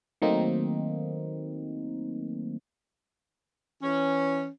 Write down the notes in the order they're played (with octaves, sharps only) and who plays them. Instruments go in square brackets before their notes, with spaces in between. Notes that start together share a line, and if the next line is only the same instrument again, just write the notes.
[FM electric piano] D#3 F#3 A3 A#3 C4 D#4
[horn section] E3 C#4